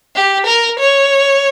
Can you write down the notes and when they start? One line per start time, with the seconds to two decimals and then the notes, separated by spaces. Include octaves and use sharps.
0.15 G4
0.46 A#4
0.79 C#5